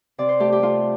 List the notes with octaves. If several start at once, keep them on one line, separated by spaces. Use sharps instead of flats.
C3 D5
C5
A3 G4
G4
A3 F4